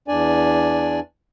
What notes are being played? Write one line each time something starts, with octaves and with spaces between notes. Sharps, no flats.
E2 D4 D5 G#5